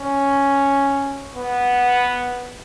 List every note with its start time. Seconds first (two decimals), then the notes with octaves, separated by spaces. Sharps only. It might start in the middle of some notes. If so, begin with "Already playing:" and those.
Already playing: C#4
1.35 B3